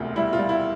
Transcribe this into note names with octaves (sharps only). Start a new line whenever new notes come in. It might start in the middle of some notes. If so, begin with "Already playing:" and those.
Already playing: E1 D2 C3 F4
G3 E4
F4
G3
E4